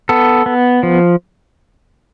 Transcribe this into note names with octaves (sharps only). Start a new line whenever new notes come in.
B3 A4
B3
F3